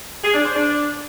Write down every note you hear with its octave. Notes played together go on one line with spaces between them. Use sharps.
G#4
D4
C5
D4